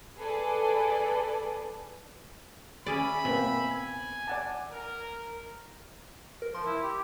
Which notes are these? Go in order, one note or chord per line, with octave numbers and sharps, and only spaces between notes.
G#4 A4 B4 D5
C#4 G#4 D5 E5 G#5 B5
B2 A#3 C4
G#5
D5 F#5 A5
A#4
A#4
F3 C6
E4
G4